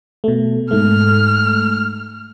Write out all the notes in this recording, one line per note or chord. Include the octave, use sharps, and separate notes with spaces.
B2 A3
G#2 A3 F6